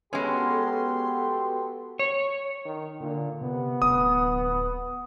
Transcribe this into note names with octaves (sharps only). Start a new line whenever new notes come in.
G#3 B3 C#4 F#4 G4 A4 C6
C#5
D#3
A#2 D3
C3 B3
D1 D#6